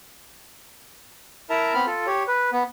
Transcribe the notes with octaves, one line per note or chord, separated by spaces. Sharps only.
E4 A#4 E5 A5 A#5
B3 C4 B5 F6
F4 A4
G4 C#5
B4
B3